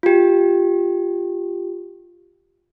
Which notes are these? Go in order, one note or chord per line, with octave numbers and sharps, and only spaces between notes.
F4 G4